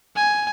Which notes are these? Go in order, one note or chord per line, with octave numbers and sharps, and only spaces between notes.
G#5